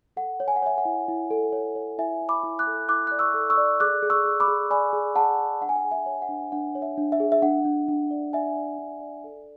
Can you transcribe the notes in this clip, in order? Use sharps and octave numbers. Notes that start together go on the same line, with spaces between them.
A4 F#5
C#5
G#5
F#5
C#5 E5 G#5
F#5
E4
E4
A4
C#5
C#5
E4 E5 G#5
E4
B5 D6
E4
D6 F#6
A4
E4 D6 F#6
D5 F#6
C#6 E6
A4
C#6 E6
D5
G#4 D6 F#6
G#4
C#6 E6
G#4
B5 D6
G#4
D5 G#5 B5
G#4
G#4 F#5 A5
G#4
D4 F#5
G#5
F#5
G#4
E5 G#5
C#5
F#5
D4
D4 F#5
C#5
E5
D4
E5
G#4
E5
D4 F#5
D4
D4
D5
D5 E5 G#5
D5
D4
D5
A4